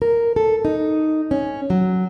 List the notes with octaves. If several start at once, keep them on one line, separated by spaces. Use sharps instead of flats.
A#4
A4
D#4
C#4
F#3